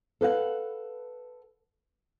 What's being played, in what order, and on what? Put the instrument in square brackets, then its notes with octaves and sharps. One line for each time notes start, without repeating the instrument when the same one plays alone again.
[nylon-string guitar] A4 B4 F5 F#5